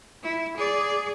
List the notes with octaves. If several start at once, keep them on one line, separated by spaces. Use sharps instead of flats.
E4
G#4 D5